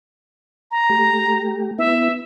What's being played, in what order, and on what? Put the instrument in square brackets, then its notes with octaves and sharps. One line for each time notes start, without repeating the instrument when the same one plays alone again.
[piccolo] A#5
[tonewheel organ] A3 G4
[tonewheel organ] B3 E4 [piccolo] E5